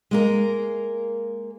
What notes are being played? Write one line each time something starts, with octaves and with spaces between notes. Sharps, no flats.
G#3 A#3 A#4